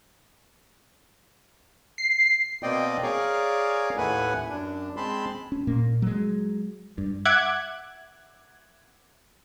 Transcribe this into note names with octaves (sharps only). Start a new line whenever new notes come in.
C7
B2 A#3 C4 D5 D#5 G5
G#4 A#4 C#5 D5 F5
D#2 A2 A3 B4 F#5 G#5
F#2 D4
G#3 C4 A5 B5 C6
C#4
A#2 A#3
F#3 G#3
G2
E5 F#5 D6 F#6 G#6